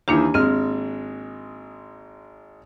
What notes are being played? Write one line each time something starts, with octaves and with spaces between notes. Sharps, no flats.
D#2 D#3 E3 A#3 D4 G4
G#1 G#3 C4 F6